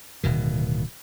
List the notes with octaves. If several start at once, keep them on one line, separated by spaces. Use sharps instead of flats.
D1 B2 D#3